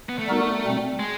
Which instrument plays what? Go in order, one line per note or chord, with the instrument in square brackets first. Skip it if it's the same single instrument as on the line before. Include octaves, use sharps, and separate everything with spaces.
[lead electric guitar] B3
A3
[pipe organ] G3 B3 D#4 F#4 A#4
B2 G3 C4
[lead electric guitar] G#3